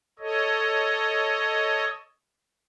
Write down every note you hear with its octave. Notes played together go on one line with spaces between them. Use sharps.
A4 C#5 D#5